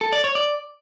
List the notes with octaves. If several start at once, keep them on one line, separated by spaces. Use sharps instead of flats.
A4
D5
C#5
D5